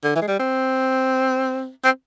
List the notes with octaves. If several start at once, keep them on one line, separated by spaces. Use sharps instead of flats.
D3
E3
G#3
G3
C4
C4